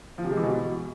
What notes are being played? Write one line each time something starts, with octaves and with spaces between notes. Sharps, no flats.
F3
C3
G#3
E3
B2